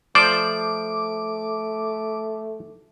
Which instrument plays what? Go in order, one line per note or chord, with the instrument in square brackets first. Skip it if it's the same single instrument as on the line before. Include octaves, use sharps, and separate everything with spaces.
[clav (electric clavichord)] F3 C5 D5 [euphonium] A3 [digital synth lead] D6